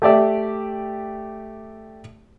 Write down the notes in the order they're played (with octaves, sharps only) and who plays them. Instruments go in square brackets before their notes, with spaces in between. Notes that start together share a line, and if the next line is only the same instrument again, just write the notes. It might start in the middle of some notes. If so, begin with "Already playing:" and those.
[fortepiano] A3 G4 D5 E5